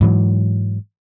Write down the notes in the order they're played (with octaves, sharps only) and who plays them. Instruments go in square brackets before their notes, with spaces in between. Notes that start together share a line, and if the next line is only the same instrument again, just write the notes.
[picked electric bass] G#2 E3 F#3